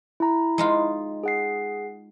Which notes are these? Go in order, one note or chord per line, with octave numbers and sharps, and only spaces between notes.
E4 A#5
G#3 D#4 F4
G#4 F#5 C7